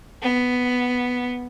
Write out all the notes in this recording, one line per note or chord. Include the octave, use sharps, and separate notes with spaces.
B3